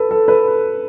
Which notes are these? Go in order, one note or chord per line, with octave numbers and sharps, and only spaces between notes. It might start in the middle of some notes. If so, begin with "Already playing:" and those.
Already playing: A4 B4
A4
B4